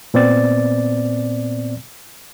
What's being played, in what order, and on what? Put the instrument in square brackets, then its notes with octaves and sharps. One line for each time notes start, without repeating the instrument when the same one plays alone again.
[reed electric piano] A#2 B3 C4 D5 A6